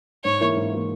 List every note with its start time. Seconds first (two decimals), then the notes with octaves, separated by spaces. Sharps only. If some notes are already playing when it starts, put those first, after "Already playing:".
0.24 G#2 C#5
0.40 E3 A#3 E4 A#4
0.57 G#2
0.73 E3 A#3 E4 A#4